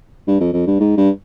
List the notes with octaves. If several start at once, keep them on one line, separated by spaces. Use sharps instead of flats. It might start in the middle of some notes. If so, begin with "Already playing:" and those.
G2
F2
F2
G2
G#2
G2